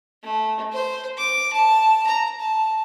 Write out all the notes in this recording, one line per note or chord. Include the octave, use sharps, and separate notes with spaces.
A3
C5
D6
A5
A#5
A5